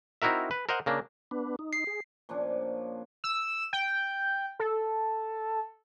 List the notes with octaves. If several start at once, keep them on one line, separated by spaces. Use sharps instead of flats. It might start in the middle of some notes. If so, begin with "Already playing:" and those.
C4 D#4 E4 F#4 A#4 E5
B4
A#4 C5 D#5 F#5
C#3 A#3 D4
B3 D4 B4
D#4
C7
G#4
A#2 F3 C#4 D4
E6
G5
A4